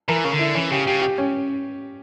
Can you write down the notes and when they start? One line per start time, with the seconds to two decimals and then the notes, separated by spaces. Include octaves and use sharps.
0.09 E3 A#4
0.24 C#3 A#4
0.32 D3
0.39 E4
0.55 E3 C#4
0.72 C#3 G4
0.87 C#3 G4
1.02 G4
1.18 C#4